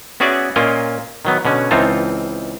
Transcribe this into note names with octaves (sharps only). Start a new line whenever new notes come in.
B3 C#4 F#4 G#4 D5 E5
A#2 A#3 C#4 F4 A#4 D#5
D#3 F#3 B3
B2 D3 C#4
C#2 E3 C4 D#4 F4 A5